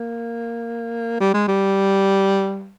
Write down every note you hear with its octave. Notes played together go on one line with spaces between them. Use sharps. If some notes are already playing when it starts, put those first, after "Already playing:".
Already playing: A#3
G3
G#3
G3